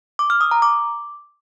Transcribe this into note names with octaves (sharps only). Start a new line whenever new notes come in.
D6
F6
D#6
A#5
D6